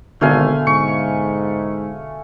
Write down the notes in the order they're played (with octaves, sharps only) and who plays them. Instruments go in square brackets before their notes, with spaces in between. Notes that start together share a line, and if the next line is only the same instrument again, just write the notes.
[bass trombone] G#1 [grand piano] B2 D3 [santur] A3 F5 G#5
[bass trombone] G#2 [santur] C#6